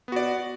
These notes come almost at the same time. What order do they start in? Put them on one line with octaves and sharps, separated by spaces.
B3 F#4 D5